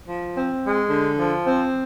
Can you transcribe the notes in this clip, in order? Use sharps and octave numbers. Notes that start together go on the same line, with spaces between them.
F3
C4
G#3
D3
F3
C4